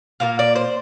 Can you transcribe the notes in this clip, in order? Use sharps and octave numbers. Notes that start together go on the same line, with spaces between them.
A#2 F3 A#3 F5
D5
C5